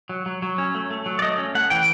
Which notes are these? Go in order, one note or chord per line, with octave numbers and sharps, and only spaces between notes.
F#3
F#3
F#3
C#4
A3
A3
F#3
D5
A3 D#5
C#4
A3 F#5
E3 G5